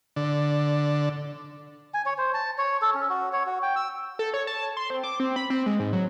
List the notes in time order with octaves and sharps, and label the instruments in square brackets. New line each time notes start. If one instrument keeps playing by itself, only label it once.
[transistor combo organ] D3
[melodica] G#5
C#5
C5
A5
C#5
A4
C#4
F#4
C#5
F#4
G5
E6
[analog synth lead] A4
C#5
A5
C6
C4
D6
C4
B5
C4
G#3
G#2
F#3